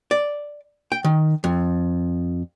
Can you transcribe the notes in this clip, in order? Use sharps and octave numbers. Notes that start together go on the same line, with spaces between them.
D5
G5
D#3
F2